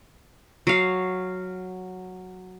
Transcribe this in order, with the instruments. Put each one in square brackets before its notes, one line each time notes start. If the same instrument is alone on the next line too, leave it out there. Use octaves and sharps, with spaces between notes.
[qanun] F#3 F5